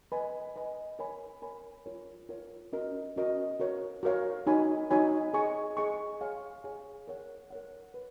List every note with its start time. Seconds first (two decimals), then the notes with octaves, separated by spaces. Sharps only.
0.12 B4 D#5 G#5 B5
0.56 B4 D#5 G#5 B5
0.99 A#4 C#5 G#5 B5
1.42 A#4 C#5 G#5 B5
1.86 F4 A#4 C#5
2.29 F4 A#4 C#5
2.73 C#4 F#4 A#4 D#5
3.16 C#4 F#4 A#4 D#5
3.60 F#4 A#4 C#5 F5
4.03 F#4 A#4 C#5 F5
4.47 D#4 F#4 C#5 G#5 B5
4.90 D#4 F#4 C#5 G#5 B5
5.34 G#4 D#5 G#5 C#6
5.77 G#4 D#5 G#5 C#6
6.21 G#4 C#5 F5 G#5
6.64 G#4 C#5 F5 G#5
7.08 A#4 C#5 F#5
7.51 A#4 C#5 F#5
7.94 B4